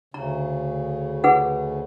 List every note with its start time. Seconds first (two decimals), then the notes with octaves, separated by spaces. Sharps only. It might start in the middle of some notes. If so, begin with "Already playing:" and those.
0.14 D2 C#3 A#5
1.24 G#4 B4 F#5